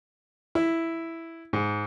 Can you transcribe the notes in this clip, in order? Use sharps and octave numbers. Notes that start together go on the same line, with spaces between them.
E4
G#2